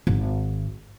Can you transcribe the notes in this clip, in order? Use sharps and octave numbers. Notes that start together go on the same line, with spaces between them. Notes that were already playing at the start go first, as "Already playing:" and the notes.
G#1